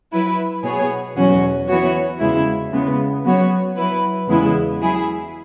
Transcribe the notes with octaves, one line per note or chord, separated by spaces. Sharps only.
F#3 E4 B4
B2 B3 G#4 C#5
E2 B2 F#3 C#4 F#4
E3 B3 F#4 C#5
E2 C#3 G#3 E4
C#3 G#3 B3
F#3 B3 F#4 C#5
F#3 E4 B4
E2 C#3 G#3 B3 E4
F#3 E4 G#4